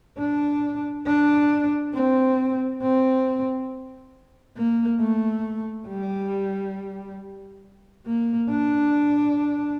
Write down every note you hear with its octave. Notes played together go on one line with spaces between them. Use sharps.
D4
D4
C4
C4
A#3
A3
G3
A#3
D4